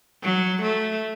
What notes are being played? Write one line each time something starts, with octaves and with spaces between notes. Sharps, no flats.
F#3
A3